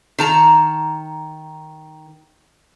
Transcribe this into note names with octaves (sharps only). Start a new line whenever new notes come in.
D#3 A5 A#5